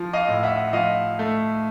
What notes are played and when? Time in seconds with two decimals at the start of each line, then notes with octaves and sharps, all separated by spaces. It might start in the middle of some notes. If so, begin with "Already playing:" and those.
Already playing: F3
0.13 D#5 F5
0.28 A2
0.43 E5 F#5
0.73 F3 D#5 F5
1.19 A3